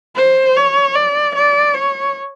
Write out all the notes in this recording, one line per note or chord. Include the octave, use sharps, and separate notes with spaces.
C5
C#5
D5
D5
C#5